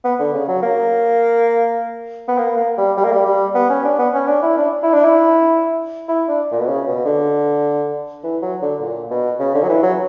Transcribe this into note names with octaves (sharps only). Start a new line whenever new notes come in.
B3
D3
C#3
F#3
A#3
B3
A#3
A#3
G3
G3
A#3
G3
G3
B3
C#4
D4
B3
C#4
D4
E4
D4
E4
D4
E4
E4
D4
A#2
B2
C#3
B2
D3
E3
F#3
D3
A#2
B2
C#3
D3
F#3
E3
F#3